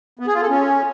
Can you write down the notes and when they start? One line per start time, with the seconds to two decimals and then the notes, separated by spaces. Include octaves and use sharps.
0.19 B3
0.27 G#4
0.34 F4
0.42 A4
0.49 C#4